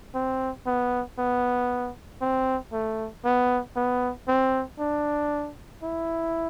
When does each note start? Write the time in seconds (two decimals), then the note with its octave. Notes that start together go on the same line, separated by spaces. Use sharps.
0.15 C4
0.66 B3
1.18 B3
2.21 C4
2.72 A3
3.24 B3
3.76 B3
4.28 C4
4.79 D4
5.83 E4